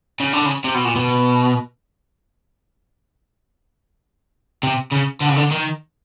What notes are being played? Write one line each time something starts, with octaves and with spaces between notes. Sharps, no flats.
C#3
D3
C#3
C3
B2
A#2
B2
C3
C#3
D3
C#3
D3
D#3